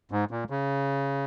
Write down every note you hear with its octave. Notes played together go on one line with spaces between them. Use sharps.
G#2
A#2
C#3